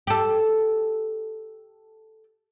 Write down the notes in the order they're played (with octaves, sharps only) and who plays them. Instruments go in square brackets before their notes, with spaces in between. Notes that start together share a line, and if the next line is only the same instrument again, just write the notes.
[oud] G4 A4